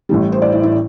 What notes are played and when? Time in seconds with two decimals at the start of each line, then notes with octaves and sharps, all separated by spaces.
0.09 A1 A2 E3 G3
0.32 C5
0.42 D5
0.52 E4
0.63 E4